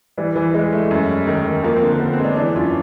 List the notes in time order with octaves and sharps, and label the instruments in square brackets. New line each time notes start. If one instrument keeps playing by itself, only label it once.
[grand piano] E3 [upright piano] G3
[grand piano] E3
[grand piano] E3 [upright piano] G#3
[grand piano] A3
F#2
G3
[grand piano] D#3 [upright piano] A3
[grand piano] D#3
[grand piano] F3 [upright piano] A#3
[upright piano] C4
[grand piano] D3
[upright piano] A#3
[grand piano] D3 [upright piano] B3
[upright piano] C4
[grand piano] G#3
[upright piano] D4
[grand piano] E3 [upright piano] D4
[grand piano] F#2 [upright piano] F4